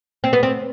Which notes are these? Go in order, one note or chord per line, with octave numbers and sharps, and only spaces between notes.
C4
B3
C4